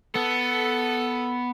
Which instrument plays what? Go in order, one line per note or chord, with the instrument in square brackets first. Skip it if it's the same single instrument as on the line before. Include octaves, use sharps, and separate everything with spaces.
[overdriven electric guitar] B3 [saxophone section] A4